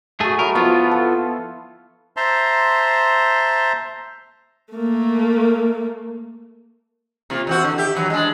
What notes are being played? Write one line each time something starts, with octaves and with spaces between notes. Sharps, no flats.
A3 F#4 G#4 A4
F#3 E4 A#4
F3 B3 E4 F4 F5
A4
C5 E5 A5 A#5 C6
A3 A#3
C3 A#3 F4
E2 C4 F#4
D3
G4 E5
D#3 E3 F#3
G#3 D4